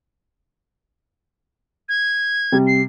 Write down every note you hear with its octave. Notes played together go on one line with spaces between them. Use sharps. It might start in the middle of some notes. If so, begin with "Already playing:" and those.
G#6
C3 G3
C7